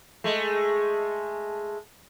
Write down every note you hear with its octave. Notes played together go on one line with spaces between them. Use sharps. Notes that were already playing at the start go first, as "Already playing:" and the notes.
G#3 A3